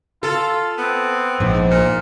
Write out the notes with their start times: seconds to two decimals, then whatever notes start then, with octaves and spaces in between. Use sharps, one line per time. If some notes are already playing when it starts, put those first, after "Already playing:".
0.23 F4 A4
0.78 B3 C4
1.40 A#1 G#2
1.71 A#2